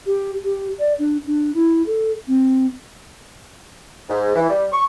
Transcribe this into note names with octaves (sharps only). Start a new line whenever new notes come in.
G4
G4
D5
D4
D4
E4
A4
C4
G#2
E3
G3
C#6